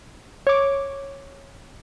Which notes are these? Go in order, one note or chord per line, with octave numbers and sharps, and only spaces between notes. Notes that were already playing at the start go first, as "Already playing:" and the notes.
C#5 D6